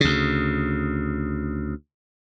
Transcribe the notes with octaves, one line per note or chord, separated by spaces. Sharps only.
D2 C#3